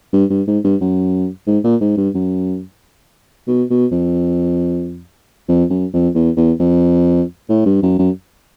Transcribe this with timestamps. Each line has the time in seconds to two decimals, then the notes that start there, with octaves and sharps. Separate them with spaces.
0.13 G2
0.30 G2
0.47 G#2
0.64 G2
0.81 F#2
1.47 G#2
1.64 A#2
1.81 G#2
1.97 G2
2.14 F#2
3.48 B2
3.70 B2
3.92 F2
5.48 F2
5.70 F#2
5.93 F2
6.15 E2
6.37 E2
6.60 F2
7.49 A2
7.66 G2
7.82 F#2
7.99 F#2